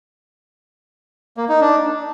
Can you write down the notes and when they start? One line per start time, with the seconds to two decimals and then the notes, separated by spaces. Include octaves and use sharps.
1.37 A#3
1.49 D#4
1.61 D4